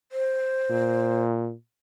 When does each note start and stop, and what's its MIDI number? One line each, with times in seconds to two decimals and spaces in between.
0.12 1.23 72
0.70 1.53 46